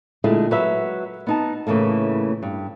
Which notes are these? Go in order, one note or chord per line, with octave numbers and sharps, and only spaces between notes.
A#2 D3 G#3 A3 E4
F#3 B4 E5
B3 D#4 A5
A2 C#3 E3 A3 A#3
G2